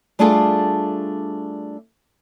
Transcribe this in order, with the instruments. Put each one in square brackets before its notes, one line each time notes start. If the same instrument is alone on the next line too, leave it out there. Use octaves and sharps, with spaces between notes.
[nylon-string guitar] G3 A3 D4 F4 G#4 A4